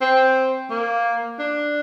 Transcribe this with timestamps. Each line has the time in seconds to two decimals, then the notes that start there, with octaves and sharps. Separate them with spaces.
0.01 C4
0.70 A#3
1.40 D4